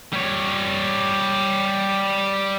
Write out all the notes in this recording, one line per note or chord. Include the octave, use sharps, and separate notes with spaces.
G3 C#5